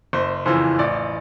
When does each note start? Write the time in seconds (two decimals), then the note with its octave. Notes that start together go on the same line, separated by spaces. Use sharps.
0.13 F#1 C5
0.46 F2 C#3 E3 C5
0.79 A1 D5